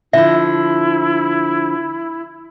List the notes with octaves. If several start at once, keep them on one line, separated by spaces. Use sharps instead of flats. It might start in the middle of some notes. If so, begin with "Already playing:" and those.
D3 F3 E4 E5